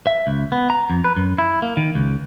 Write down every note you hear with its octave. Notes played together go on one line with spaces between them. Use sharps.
E5
C#2
B3
A#5
F2
B4
F#2
E4
A#3
D#3
C#2